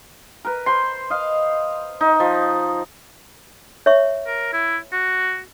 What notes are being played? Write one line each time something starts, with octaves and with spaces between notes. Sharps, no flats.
A#4 B4
C5 B5 C6
D#5 F5
D#4
F3
C#5 E5 C#6
A#4
E4
F#4